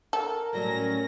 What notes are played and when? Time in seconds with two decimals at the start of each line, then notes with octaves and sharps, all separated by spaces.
0.13 A4 A#4
0.53 A2 F#3 G3 C#4 A#6